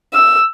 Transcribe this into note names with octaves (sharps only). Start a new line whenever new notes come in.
E6